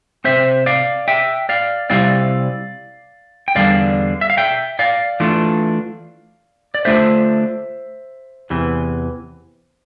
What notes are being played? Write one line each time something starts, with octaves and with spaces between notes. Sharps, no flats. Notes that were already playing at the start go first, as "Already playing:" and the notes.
C3 F3 C4 C5 E5
D5 F5
E5 G5
D5 F5
C3 G3 C4 E4 D5 F5
G5
E2 D3 G3 D4 D5 F5
E5
F5
E5 G5
D5 F5
E3 A3 D4 F4
D5
D3 A3 D4 F4 C5 E5
E2 C3 E3